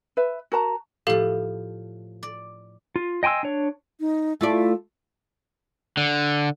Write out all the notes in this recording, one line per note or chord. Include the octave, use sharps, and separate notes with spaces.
B4 E5
F#4 A#4 A5 A#5
A2 F3 G4 A4 F5
D5
F4
D#5 G5 G#5 C6 E6
D4 C#5
D#4
A3 E4 F4 D5
D3